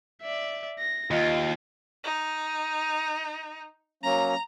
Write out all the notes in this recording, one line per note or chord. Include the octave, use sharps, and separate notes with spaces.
D5 E5
A#6
D#2 F4 D#5
D#4
F#3 A#3 C#4 A#5